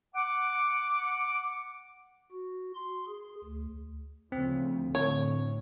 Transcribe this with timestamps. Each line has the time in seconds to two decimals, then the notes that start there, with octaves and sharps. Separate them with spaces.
0.15 F#5 D6
2.31 F#4
2.75 C6
3.08 G#4
3.45 D2
4.32 D2 C#3 F3 C4
4.95 D2 A2 D3 C#5